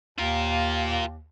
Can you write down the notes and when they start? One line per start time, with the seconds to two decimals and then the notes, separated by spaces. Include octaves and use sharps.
0.18 D#2 F4 A#4